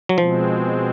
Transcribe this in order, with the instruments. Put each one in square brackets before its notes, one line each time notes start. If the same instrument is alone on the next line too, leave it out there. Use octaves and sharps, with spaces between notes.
[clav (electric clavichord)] F#3
[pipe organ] B2 G#3 C4 [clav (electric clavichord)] F3